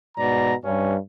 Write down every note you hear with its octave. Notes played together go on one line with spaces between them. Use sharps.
G#2 B2 D5 A#5
G2 C#4